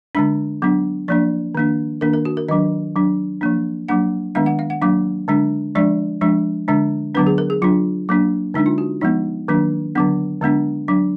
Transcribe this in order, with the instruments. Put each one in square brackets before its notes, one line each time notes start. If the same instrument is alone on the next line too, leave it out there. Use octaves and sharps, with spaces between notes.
[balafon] D3 G#3 D4 B5
F#3 B3 D4
F3 A#3 D4 D5
D#3 A#3 D4
D#3 A#3 D4 A#4
A#4
F#4
A#4
D#3 F#3 D4 D#5
F#3 D4
F3 A#3 D4
F#3 A#3 D4 F#5
D#3 G#3 B3 D4 F5
F#5
F5
F#5
F#3 A#3 D4 F5
D3 G#3 D4
F3 G#3 D4 D5
F3 G#3 D4
D3 G#3 D4
D3 F#3 B3 D4 B4
G#4
A#4
G#4
F#3 D4 F4
F#3 A#3 D4
D3 G#3 D4 D#4
F4
F#4
F3 G#3 B3 D#4
D#3 F#3 A#3 D4
D3 F#3 B3 D4
D3 G#3 B3 D4
F#3 D4